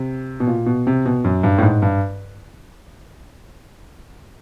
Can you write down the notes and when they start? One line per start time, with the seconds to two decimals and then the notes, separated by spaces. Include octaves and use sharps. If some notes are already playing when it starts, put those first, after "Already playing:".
Already playing: C3
0.40 B2
0.47 A#2
0.66 B2
0.87 C3
1.06 B2
1.24 F#2
1.43 G2
1.58 A2
1.63 G#2
1.82 G2